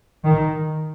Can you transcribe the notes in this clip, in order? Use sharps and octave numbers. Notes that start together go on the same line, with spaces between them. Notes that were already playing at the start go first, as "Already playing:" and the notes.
D#3